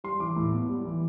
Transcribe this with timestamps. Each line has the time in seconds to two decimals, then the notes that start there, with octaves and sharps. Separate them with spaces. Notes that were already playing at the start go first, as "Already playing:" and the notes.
0.04 G3 C6
0.20 E3 D6
0.36 A2
0.52 B3
0.69 G3
0.85 E3